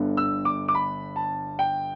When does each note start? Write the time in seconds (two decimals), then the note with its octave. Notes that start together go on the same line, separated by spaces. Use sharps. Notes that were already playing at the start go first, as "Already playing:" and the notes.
Already playing: G1 G2 D3 B3
0.17 E6
0.45 D6
0.68 D6
0.75 B5
1.16 A5
1.59 G5